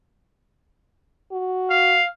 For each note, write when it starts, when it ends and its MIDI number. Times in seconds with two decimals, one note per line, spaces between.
1.32 2.00 66
1.70 2.07 77